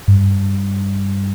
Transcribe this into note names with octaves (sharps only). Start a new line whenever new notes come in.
G2